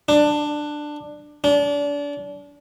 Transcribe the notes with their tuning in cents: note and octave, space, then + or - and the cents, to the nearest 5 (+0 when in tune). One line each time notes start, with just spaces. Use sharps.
D4 +15
D4 -30